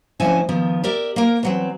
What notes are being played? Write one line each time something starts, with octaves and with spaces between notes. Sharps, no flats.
D2 F3 C4 C#4 E4 G#5
D#3 F3 B3
G4 A#4 D5 E5
A#3 A#4
E3 F#3 C4